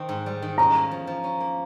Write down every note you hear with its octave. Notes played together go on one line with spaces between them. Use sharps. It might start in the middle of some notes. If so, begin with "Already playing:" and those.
Already playing: D#3 C4
G#2
G3
D#3
C#4 A#5
A#3
F3
F3
C#4
A#3